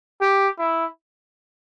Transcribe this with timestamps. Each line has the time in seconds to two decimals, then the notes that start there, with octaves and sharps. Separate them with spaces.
0.21 G4
0.59 E4